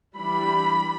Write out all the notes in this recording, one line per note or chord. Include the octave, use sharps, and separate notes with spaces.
E3 G3 D4 B5